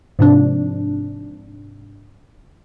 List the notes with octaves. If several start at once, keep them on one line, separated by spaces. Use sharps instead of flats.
G#2 C3 F3 D4